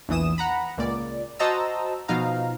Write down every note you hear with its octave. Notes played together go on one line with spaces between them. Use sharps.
A#1 E2 E3 D#6 E7
F#5 A#5 B5
C#2 A#2 D5
F#4 C5 D#5 A5 A#5 E6
B2 F3 D#4 F5 A#5